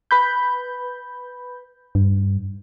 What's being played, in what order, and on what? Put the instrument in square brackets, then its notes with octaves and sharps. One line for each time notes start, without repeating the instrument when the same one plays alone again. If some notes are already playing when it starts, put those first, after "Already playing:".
[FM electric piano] B4 B5 G6
[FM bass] G2